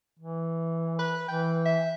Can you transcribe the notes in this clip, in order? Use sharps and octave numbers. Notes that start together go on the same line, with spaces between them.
E3
B4
E3 G5
E5